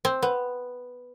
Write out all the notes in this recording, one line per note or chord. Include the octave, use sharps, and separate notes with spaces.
C4
B3